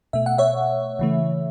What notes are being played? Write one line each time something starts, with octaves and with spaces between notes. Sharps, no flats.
B2 A3 E5
F#5
C#5 E5
C#3 E3 A3